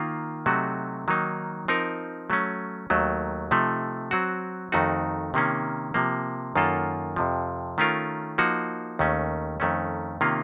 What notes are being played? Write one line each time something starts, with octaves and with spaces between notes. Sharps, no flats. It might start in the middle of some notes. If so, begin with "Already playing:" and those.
Already playing: D#3 A#3 F4
C3 F#3 A3 D#4 F#4
D#3 F#3 A#3 D#4
F3 C4 D#4 A#4
F#3 A3 C#4
D#2 D#3 F#3 A3
C3 F3 A3 D#4
F#3 C4 F#4
F2 D#3 A3 D#4 F#4
C3 D#3 A#3 C#4
C3 F3 A#3
F#2 D#3 A#3 F4 A4
F2 C3 F3
D#3 A3 C#4 F4 A#4
F3 A#3 D#4 F#4
D#2 D#3 A3 C#4
F2 D#3 A3 C#4
C3 D#3 A#3 C#4 F4